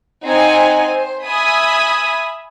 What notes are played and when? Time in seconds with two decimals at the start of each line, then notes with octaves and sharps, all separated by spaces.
0.24 C4 D#4 F#5 G#5
0.92 C5
1.25 E5 G#5 B5 D#6